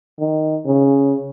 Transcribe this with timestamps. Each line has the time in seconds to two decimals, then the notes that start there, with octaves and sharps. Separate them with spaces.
0.20 D#3
0.66 C#3